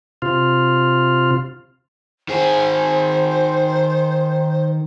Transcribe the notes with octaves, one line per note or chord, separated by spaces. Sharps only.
C3 F4
D#3 G#4 C5